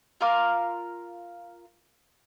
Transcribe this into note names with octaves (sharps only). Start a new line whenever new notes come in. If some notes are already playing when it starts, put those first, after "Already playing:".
F4 A#4 F5 D6